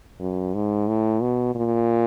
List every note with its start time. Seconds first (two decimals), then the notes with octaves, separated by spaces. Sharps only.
0.20 F#2
0.54 G#2
0.88 A2
1.22 B2
1.55 A#2